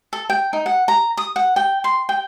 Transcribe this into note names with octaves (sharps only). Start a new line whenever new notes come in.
A4
G5
D#4
F#5
A#5
D#6
F#5
G5
C6
G5